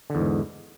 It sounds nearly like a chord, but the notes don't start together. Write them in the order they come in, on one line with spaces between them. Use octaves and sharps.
D3 E2 G#2